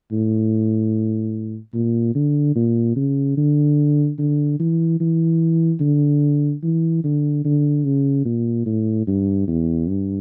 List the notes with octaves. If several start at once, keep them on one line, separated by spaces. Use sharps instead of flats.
A2
A#2
D3
A#2
C#3
D3
D3
E3
E3
D3
E3
D3
D3
C#3
A#2
A2
G2
E2
G2